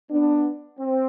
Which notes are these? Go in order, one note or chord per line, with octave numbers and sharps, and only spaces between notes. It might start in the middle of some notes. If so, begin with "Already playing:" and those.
B3 D4
C4